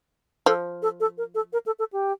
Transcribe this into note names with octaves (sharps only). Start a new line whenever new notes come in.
F3 A4
A4
A4
A#4
A4
A#4
A4
A4
G4